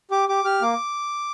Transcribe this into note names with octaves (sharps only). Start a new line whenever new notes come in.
G4 D6
G4 D6
G4 F6
A#3 D6